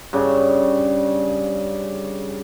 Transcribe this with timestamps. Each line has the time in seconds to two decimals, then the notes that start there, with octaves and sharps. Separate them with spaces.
0.13 G2 C#3